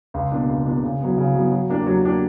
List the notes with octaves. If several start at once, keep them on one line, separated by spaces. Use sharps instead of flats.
C#2
B2 A#3 D4
C#2
B2 A#3 D4
C#3
F#3 B3
C#3
F#3 B3
F#3
A#3 D4 G4
F#3
A#3 D4 G4